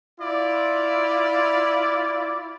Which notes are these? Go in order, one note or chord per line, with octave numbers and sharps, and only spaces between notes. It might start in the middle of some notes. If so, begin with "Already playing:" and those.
E4 F4 D5